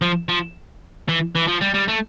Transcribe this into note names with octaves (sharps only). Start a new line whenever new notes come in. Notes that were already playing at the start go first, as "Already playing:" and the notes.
F3
F3
E3
E3
F3
G3
G3
A3